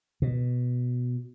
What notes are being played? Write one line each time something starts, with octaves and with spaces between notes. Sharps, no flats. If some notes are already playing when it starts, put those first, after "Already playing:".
B2